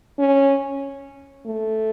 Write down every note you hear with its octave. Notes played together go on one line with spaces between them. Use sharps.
C#4
A3